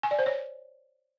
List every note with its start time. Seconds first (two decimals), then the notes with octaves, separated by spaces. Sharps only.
0.03 G#5
0.11 D5
0.19 C5
0.26 C#5